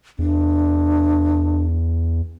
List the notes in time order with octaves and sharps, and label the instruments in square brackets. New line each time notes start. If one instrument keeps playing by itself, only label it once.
[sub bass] E2 [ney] D4